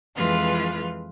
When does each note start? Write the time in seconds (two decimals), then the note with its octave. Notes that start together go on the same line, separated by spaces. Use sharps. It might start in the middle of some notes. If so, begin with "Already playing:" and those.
0.16 F2 E3 G#3 F4 B4 F6